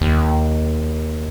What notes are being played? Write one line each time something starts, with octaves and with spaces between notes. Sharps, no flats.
D#2